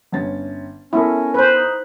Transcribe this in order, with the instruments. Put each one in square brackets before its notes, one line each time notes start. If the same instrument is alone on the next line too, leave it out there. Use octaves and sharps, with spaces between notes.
[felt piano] G1 C#4 A6
[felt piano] B3 A4 A#4 [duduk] C#4 [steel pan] E4
[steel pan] B4 C5
[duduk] D#4